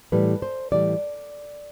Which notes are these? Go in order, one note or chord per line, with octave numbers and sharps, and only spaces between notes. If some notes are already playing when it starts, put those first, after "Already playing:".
A2 E3 G3 B4
C5
A2 E3 G3 D5